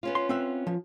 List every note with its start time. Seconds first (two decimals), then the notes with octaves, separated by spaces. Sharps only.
0.03 B3 C#4 F4
0.15 C6
0.29 C4 E5 F#5
0.67 F3